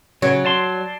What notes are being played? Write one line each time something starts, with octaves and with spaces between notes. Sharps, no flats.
C#3 F#3
D5 A5 C6